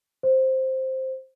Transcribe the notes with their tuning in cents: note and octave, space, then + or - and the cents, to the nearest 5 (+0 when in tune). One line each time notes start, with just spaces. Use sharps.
C5 +5